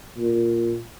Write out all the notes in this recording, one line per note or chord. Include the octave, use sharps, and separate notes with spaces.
A#2